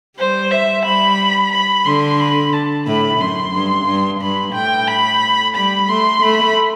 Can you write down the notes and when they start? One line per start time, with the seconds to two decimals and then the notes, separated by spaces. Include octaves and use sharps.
0.18 G3 C5
0.51 E5
0.85 G3 B5
1.52 B5
1.86 D3 C6
2.19 B5
2.53 A5
2.87 A2 B5
3.20 F#2 C6
3.54 G2
3.87 G2
4.21 G2 B5
4.55 A2 G5
4.88 B5
5.55 G3 B5
5.88 A3 C6
6.22 A3 B5